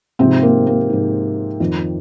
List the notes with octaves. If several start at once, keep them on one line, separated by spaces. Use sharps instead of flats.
G#2 C3 F3 C4
A#3
A#3
G#2 F3
F2 D#3